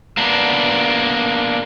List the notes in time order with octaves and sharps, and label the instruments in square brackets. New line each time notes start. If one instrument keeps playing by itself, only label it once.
[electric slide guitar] A#3 B3 D4